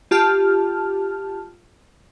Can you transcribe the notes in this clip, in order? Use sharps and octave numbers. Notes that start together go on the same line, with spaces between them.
F4 G4 A5 F6